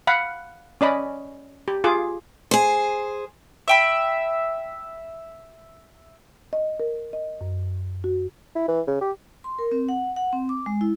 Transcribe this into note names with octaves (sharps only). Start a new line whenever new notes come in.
F5 F#5 B5
C#4 D5 D#5 B5
G4
F4 G#4 D6
G#4 C5
E5 G5 B5
D#5
A#4
D#5
F#2
F#4
E4
E3
C#3
G4
C6
A#4
C4
F#5
F#5
C4
D6
G#3
E4